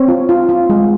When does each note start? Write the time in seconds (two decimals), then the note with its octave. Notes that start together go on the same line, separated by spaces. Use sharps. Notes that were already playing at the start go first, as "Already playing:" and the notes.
Already playing: C4 C#5
0.08 F4
0.29 F4
0.49 F4
0.70 G#3